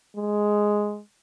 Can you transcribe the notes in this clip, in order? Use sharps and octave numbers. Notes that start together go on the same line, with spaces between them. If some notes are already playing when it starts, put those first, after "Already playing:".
G#3